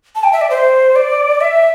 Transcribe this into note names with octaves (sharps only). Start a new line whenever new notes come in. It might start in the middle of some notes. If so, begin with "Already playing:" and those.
A5
G5
E5
D5
C5
D5
E5